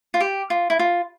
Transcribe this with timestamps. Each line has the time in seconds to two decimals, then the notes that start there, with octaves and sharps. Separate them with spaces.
0.14 F4
0.20 G4
0.50 F4
0.70 E4
0.79 F4